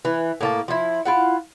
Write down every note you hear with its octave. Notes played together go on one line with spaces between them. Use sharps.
E3
A2 A#3 A5
F3 E4
E4 F4 F#5